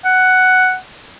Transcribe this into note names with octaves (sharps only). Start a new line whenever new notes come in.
F#5